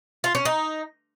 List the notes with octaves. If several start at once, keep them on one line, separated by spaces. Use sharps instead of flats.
F4
C#4
D#4